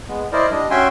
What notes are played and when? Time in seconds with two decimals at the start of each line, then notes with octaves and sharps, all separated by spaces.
0.08 G#3 B3
0.32 E4 A#4 C5 D5 D#5
0.51 G3 D4 D#5
0.70 C#4 F#4 E5 G5 G#5 C6